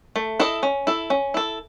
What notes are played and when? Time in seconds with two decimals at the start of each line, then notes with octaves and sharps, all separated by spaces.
0.16 A3
0.40 E4 A4 D#5
0.63 C#4
0.87 E4 A4
1.10 C#4
1.34 E4 A4